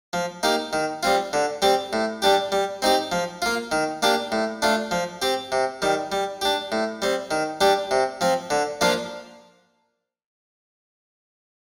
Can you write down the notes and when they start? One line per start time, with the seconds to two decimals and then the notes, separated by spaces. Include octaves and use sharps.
0.13 F3
0.43 A#3 D#4 G4
0.73 D#3
1.03 G3 C4 F4
1.33 D3
1.62 G3 C4 G4
1.93 A2
2.22 G3 D4 G4
2.52 G3
2.82 C4 D#4 G4
3.12 F3
3.42 A#3 F4
3.72 D#3
4.02 A#3 D4 G4
4.32 A2
4.62 A3 D4 F4
4.91 F3
5.22 C4 G4
5.52 C3
5.82 D#3 G3
6.12 G3
6.41 D4 G4
6.72 A2
7.02 G3 C4
7.31 D#3
7.61 G3 D4 G4
7.91 C3
8.21 F3 C4
8.50 D3
8.81 F3 A#3 D4 F4